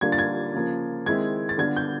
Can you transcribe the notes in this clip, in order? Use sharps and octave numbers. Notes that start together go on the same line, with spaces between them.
D3 G3 A#3 D4 F4 G#6
A6
G#6
C#3 F3 A#3
D#3 G#3 C4 E4 G#6
A6
D3 G3 B3 D4 F4 G#6
G6